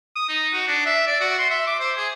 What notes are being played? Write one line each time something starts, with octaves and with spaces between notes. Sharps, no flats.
D#6
D#4
F#4
D4
E5
D5
F#4
C6
E5
D6
C5
G#4